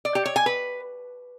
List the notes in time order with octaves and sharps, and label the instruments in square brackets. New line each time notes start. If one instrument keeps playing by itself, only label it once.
[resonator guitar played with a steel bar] D5
G4
C#5
G#5
B4